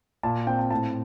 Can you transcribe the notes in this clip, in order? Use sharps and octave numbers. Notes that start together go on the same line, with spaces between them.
A#2 A5
C4 G5
A5
A2 A5